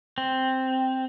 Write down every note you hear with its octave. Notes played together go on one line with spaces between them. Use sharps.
C4